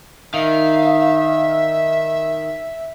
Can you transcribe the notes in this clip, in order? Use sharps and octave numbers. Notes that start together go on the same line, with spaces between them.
D#3 E5 F5